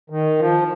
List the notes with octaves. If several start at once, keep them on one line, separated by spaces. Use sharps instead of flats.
D#3
F3